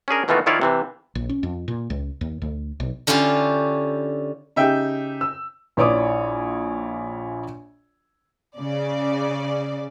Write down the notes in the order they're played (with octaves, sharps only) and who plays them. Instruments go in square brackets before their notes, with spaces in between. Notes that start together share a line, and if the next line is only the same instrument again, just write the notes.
[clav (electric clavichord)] C#4 D4 G#4 A#4
B2 D#3 E3 A3 F4 F#4
D#3 F3 E4 F4 C#5 D5
C3 E3 C5
[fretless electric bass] A#1
C#4
F2
A#2
C#2
D#2
D2
B1
[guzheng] D3 C#4 E4 F4 G4
[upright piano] C#3 G4 [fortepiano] D#4 E5 G5
[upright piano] E6
[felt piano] A#1 E4 C#5 D5 D6 D#6
[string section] C#3 D5